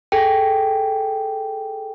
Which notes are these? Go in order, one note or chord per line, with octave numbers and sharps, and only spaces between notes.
G#4 A4 G5